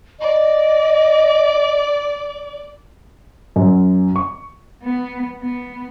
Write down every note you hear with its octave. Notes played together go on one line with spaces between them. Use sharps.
D5 D#5
F#2
C#6
B3
B3